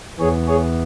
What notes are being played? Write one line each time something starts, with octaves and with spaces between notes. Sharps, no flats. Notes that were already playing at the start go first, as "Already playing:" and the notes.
E2 E3 B3 G#4 C#5
G#4 C#5